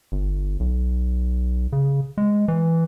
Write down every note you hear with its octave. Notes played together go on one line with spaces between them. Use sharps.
G1
B1
C#3
G#3
E3